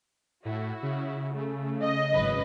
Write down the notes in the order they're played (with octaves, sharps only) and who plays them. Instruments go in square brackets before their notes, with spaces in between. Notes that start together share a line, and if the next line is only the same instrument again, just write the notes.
[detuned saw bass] A2 [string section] E4 F#4
[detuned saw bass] C#3
[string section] A3
[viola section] D#5
[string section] G#1 F#2 B4